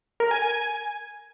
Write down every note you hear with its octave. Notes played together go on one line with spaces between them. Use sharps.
A#4
G#5
G#5